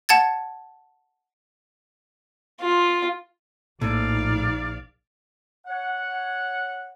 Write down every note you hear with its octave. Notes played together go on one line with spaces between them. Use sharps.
F#5 A5 G#6 A6
F4
A#1 A2 D#4 D5 F5
C#5 F#5